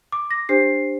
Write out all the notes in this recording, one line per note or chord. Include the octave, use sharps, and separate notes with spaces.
D6
A#6
D4 G4 C5 C7